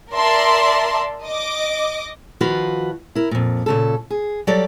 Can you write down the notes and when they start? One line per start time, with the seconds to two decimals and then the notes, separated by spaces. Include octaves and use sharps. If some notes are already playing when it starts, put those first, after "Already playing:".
0.14 A#4 D5 E5 A5 C6
1.24 D#5 D6
2.40 D#3 F3 F4 F#4 B4
3.15 E4 A#4
3.31 F2 A#2
3.66 A#2 C#3 A4
4.10 G#4
4.47 F#3 G3 G4 A4 D5